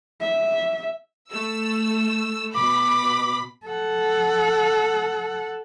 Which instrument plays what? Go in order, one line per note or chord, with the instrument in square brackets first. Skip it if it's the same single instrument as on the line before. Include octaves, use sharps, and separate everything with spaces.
[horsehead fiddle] E5
[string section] A3 E6
[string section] B2 B5 [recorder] D6
[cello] A4 F#5